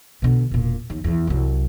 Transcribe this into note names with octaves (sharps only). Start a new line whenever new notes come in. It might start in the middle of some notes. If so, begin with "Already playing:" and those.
B2 D3
E1 A#2
D#2
E2 E3
C2 F#3